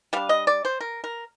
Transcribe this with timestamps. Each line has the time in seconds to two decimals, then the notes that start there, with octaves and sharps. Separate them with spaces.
0.13 G3 D4 F5
0.29 D#5
0.47 D5
0.65 C5
0.81 A#4
1.04 A#4